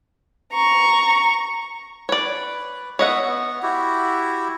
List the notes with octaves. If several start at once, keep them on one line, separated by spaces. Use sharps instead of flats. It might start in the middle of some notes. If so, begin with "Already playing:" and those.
A#5 C#6
B4 C#5 D5
B3 C#5 D#5 E5 F#5
B3
E4 F#4 G4